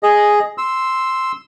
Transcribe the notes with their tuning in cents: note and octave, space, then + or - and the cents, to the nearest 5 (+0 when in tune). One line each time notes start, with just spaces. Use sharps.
G#4 +0 D#5 +0
C6 +0 E6 +0